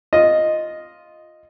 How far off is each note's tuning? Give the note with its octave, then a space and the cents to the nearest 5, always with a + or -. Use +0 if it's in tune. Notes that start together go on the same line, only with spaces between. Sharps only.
F4 +0 D#5 +0